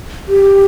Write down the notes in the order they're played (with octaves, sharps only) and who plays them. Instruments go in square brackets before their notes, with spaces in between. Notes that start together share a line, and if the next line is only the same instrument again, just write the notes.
[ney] G4